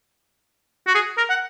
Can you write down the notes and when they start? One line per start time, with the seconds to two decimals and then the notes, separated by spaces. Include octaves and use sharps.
0.87 F#4
0.95 G#4
1.18 A#4
1.30 F#5